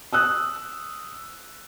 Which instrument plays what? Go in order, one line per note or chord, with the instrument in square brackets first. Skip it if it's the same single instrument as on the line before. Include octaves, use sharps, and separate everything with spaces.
[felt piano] D#6 E6 F#6